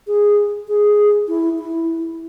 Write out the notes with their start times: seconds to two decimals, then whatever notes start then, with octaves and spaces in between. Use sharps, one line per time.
0.07 G#4
0.68 G#4
1.28 E4
1.59 E4